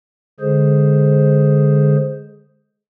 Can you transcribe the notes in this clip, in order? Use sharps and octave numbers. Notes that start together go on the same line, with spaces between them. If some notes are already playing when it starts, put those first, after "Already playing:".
D3 G#3 G#4 C5